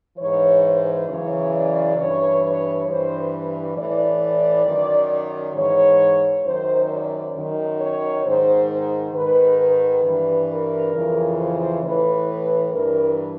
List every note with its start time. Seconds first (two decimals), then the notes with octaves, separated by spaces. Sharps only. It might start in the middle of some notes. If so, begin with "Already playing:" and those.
0.17 G#2 E3 C#5
0.63 C5
1.07 F#2 C#3 E3 C#5
1.52 D5
1.97 G2 E3 C#5
2.42 C#5
2.87 G2 E3 C5
3.77 A2 E3 D5
4.66 F#2 D#3
5.55 G#2 E3 C#5
6.44 F#2 D#3 C5
6.90 D5
7.34 F#2 D#3
7.79 C#5
8.24 G#2 D#3 C5
8.68 C5
9.14 G#2 D#3 B4
9.58 B4
10.03 G2 E3
10.48 A#4
10.93 F2 C#3 E3
11.38 C5
11.82 A2 E3 B4
12.71 G2 E3 A#4